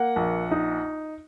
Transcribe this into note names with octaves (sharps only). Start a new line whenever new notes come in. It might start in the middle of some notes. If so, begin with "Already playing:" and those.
Already playing: A#3 F#5
A#1
D#4